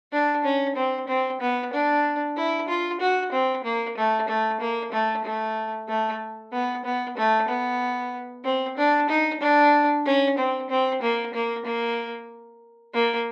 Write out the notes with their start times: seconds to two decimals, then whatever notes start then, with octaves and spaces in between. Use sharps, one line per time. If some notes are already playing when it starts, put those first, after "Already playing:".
0.12 D4
0.44 C#4
0.76 C4
1.08 C4
1.41 B3
1.73 D4
2.37 E4
2.69 F4
3.00 F#4
3.32 C4
3.64 A#3
3.97 A3
4.28 A3
4.60 A#3
4.93 A3
5.24 A3
5.89 A3
6.53 B3
6.85 B3
7.17 A3
7.48 B3
8.44 C4
8.77 D4
9.10 D#4
9.41 D4
10.05 C#4
10.38 C4
10.70 C4
11.02 A#3
11.34 A#3
11.65 A#3
12.94 A#3